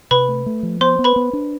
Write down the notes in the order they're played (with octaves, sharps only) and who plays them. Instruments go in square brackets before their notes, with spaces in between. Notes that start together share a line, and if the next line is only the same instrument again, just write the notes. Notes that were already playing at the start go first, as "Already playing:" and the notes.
[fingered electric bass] C3 [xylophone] B4 B5
[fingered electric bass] A3
A3
F3
[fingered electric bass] B3 [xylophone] C5 C6
[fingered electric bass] B3
[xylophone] B4 B5
[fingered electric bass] B3
D4